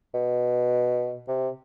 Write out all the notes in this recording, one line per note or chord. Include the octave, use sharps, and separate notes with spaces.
B2
C3